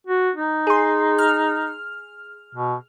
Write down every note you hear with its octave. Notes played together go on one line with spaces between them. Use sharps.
F#4
D#4
G#4 C6
F6
B2